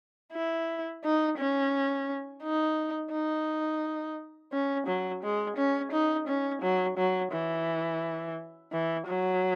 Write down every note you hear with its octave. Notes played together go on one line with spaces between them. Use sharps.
E4
D#4
C#4
D#4
D#4
C#4
F#3
G#3
C#4
D#4
C#4
F#3
F#3
E3
E3
F#3